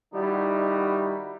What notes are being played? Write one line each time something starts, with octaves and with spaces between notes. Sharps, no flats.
D#3 G3 D#4 E4 F#4